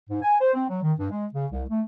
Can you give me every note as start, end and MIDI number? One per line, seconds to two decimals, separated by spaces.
0.09 0.22 44
0.22 0.36 80
0.40 0.54 72
0.54 0.65 60
0.69 0.79 54
0.82 0.93 51
0.99 1.09 43
1.10 1.25 56
1.33 1.47 49
1.52 1.63 36
1.69 1.81 57